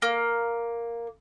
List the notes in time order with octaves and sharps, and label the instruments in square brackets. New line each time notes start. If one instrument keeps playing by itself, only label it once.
[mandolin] A#3